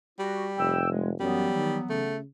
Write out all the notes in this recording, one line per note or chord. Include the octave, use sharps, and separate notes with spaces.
G3 F#4
F1 G5 E6
G#3
F#2 E3 F#3 G3 B3
D#3
C#3 A3